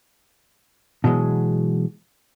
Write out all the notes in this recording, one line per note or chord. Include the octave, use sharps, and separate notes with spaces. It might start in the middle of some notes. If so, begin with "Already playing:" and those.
B2 E3 F#3 G#3